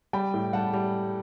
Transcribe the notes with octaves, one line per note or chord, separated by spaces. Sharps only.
G3 G5 B5
A2
G3 F#5 A5
G3